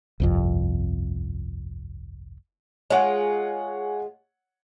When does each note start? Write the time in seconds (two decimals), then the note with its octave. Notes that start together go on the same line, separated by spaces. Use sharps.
0.20 G1 C2 F2
2.90 G#3 F4 C#5 F#5